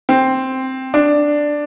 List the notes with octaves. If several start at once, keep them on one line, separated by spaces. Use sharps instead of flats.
C4
D4